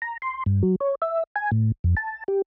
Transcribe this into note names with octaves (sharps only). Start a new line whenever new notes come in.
A#5
C6
G2
F#3
C#5
E5
G#5
A2
F2
A5
G4